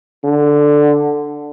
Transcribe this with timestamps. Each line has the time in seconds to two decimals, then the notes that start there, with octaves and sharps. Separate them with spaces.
0.24 D3